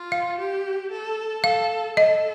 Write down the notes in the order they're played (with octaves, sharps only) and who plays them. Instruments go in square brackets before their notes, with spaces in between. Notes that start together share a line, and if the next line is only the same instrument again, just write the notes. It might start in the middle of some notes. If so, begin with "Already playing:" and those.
Already playing: [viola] F4
[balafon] F5
[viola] G4
A4
[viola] A4 [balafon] F5
[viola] A4 [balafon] D#5